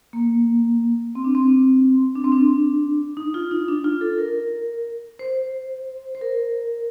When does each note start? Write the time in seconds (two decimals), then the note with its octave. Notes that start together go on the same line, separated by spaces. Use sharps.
0.13 A#3
1.15 C4
1.24 D4
1.35 C4
2.15 D4
2.24 C4
2.32 D4
3.17 D#4
3.34 F4
3.51 D#4
3.68 D4
3.84 F4
4.01 A4
4.18 A#4
5.19 C5
6.15 C5
6.21 A#4